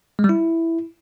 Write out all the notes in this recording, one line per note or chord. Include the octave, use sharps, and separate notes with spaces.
G#3
G3
E4